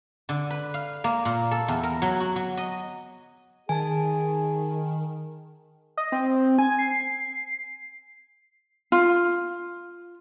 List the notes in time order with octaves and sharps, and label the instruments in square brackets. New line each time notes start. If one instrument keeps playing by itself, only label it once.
[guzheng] D3
B4
F5
A#3
A#2
A4
E2
A#4
F#3
F#4
F#3
D#5
[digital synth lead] D#3 [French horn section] G#4 [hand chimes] G#5 A5
[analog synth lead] D#5
C4
G#5
C7
[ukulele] F4